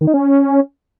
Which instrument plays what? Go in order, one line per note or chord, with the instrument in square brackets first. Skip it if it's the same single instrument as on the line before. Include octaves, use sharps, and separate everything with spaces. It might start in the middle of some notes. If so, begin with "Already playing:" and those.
[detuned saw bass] D#3
D#4
C#4